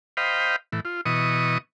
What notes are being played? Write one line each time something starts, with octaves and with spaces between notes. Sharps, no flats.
C5 D#5 F5 G5 B5
A2 E3
F4
B2 E3 D#5 C#6 D#6